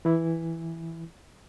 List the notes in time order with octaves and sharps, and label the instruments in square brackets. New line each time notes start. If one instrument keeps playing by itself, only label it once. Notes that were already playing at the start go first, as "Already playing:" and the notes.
[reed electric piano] E3 E4